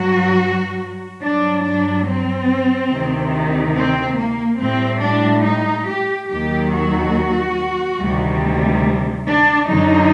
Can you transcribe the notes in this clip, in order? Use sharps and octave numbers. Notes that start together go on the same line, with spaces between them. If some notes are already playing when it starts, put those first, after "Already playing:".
Already playing: G2 F#3 F#4
G2 F#3 D4
D4
C4
D2 C3 D#3
C4
A#3
A2 G3 C4
D4
D#4
G4
D#2 D#3 F#3 G4
F#4
D2 C3 D#3 G3
D4
F#2 D3 F#3 D#4